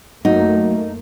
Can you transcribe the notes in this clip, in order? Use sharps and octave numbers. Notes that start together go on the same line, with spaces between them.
F#2 F#3 A3 A#3 D#4